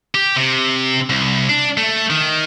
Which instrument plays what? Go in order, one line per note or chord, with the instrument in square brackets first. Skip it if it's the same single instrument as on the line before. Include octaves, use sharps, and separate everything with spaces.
[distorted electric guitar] G4
C3
C2
D4
A3
D#3